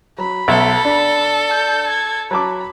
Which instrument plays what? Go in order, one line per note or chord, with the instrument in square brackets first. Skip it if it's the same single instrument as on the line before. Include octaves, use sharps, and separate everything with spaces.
[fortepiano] F#3 [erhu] B5
[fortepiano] B1 E5 [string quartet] A4
[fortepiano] D4
[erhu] G6
G#6
[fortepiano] F#3 A5 D6 [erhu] B5